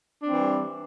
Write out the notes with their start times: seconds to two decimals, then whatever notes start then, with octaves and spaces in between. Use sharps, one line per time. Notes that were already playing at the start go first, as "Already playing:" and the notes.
0.22 D4
0.27 C4
0.31 E3
0.36 G3